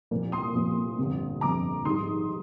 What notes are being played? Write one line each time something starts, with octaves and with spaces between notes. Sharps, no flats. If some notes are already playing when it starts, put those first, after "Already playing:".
C2 A#2 F3 A#3
C6 D#6
C2 A#2 F3 A#3
G1 F2 C3
G1 F2 C3 A#5 D6
G#1 G#2 G3 C6 D#6